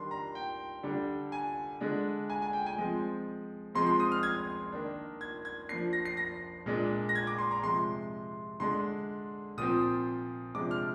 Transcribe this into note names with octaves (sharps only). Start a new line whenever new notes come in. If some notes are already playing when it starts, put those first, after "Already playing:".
Already playing: D#3 G3 D4 C6
A#5
G5
D3 G3 D4
G#5
D3 G#3 D4
G#5
G#5
G5
G#5
F3 G#3 C4
F3 G#3 C4 C6
C6
D#6
F6
G#6
D#3 A#3 D4
G#6
G#6
F3 A#3 D4 C7
A#6
C7
A#6
A#2 G#3 D4
A#6
G#6
D6
C6
A#5
C3 F3 G#3 C6
D3 G#3 D4 C6
A#2 F3 C4 D#6
C3 F3 G#3 D4 D6
F6